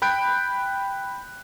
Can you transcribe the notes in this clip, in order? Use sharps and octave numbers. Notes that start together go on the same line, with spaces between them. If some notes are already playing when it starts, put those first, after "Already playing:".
G5 B5 F#6 G6 D7